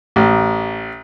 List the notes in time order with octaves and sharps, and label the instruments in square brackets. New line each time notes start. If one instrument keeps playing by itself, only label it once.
[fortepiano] A1